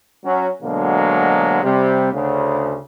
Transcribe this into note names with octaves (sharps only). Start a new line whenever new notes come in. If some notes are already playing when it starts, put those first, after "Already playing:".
F#3 C#4
D2 B2 D3 F#3 G#3 A#3
C3 G3
D2 C#3